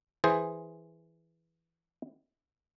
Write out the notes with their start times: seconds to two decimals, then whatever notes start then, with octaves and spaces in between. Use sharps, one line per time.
0.24 E3 G#4 C5